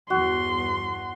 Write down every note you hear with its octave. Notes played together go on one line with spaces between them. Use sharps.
G1 E2 F#4 C6